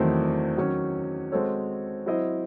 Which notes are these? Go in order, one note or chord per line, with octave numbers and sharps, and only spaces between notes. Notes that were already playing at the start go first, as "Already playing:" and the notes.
Already playing: E2 D#3 F#3 A3 C4
D#3 F#3 C#4
G#3 C4 F#4 A4 C#5
F#3 C4 E4 C5 D#5